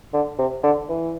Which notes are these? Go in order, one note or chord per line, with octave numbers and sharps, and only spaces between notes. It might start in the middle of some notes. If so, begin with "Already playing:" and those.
D3
C3
D3
E3